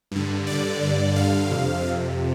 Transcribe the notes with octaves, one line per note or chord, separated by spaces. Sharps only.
G2 D3
G2 D3 D5
G2 D3
G2 D3 F5
F2 C3
F2 C3